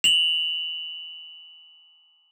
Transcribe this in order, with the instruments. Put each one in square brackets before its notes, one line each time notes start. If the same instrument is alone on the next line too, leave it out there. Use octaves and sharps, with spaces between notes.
[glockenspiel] F7 F#7